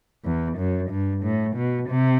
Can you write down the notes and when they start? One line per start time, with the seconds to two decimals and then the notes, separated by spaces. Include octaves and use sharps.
0.25 E2
0.57 F#2
0.90 G2
1.23 A2
1.56 B2
1.89 C3